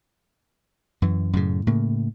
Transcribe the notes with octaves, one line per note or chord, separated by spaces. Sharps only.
F#2 E3
F#2 A2 C#3
A2 C#3 A#3